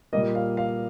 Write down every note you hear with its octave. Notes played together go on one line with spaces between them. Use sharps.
A#2 G3 A#3 D#5
F5
F5